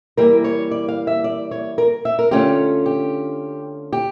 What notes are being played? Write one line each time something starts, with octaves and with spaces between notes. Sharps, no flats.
E3 G3 A#3 A#4
C#5
D5
F5
E5
D5
C#5
A#4
E5
A#4
D3 A3 C#4 F4 G4
G4
G4